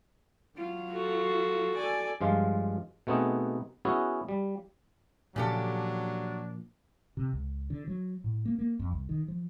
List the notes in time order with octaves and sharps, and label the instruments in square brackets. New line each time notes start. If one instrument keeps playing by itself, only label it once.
[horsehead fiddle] F#3 F4
[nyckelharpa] F#4 A4
[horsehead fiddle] A4 G#5 [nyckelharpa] D5
[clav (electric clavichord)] G2 F3 G#3 F4
B2 A3 B3 C4 D#4 G#4
B3 C#4 E4 F#4 G#4
G3
[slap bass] A#2 F3 [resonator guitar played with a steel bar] C#3 G4 A4 [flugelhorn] F#3 [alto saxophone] D4
[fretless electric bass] C3
C#2
D3
F#3
A2
A#3
A#3
F2
C2
D#3
F3